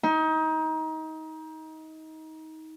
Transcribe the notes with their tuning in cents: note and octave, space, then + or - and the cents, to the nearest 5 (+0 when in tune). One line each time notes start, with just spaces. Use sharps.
D#4 +25